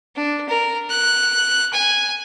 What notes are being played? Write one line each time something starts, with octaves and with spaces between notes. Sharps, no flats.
D4
A#4
F#6
G#5